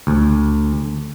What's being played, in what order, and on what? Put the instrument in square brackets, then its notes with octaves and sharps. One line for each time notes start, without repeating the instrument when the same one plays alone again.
[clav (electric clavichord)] D2